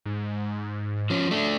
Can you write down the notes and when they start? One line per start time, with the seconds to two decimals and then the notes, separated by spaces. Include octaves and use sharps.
0.05 G#2
1.10 F3 C#4
1.31 A3 D4